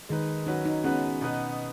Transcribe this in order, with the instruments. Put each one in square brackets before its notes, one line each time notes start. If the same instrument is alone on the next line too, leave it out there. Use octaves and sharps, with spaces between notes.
[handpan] D#3 [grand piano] G#3 D#4 B4
[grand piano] F#3 C#4 F#4 B4 [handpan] D#4
[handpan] D#4
[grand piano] G#3 B3 F#4 B4 [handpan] C#4
[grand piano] B2 B3 D#4 B4